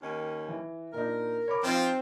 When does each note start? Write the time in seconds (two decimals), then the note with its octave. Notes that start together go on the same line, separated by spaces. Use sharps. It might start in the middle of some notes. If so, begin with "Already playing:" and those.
0.03 D#2 D#3 C#4
0.49 E3
0.93 A#2 D4 D#4 A#4
1.48 C#5 B5 D6
1.63 F3 C4 D#4 F4 C5